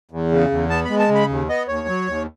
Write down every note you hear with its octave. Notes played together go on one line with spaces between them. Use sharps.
E2
C#3
E2
B3 A5
G#3 B5
A5
C#3
B5
D#2
B3 D#5
D#2 C#5
F#3
D#2